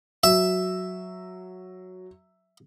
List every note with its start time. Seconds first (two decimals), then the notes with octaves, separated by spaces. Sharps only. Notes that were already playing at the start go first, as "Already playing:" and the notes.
0.24 F#3 E5